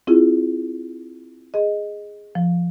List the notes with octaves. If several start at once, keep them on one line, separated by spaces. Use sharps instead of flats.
C4 E4 F4 G#4
G#4 D#5
F3